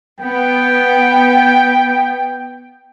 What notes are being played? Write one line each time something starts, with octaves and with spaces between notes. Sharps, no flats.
B3 G5